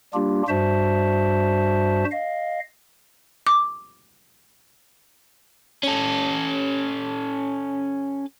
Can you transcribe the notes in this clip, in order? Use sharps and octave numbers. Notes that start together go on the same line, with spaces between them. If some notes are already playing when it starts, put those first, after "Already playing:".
G3 A#3 D4 F4 G4
G2 G3 F#4 C5 E5 A5
D#5 F5
D6
C#4 A4